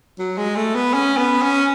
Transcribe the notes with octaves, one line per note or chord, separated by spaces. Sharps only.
F#3
G#3
A3
B3
C#4
B3
C#4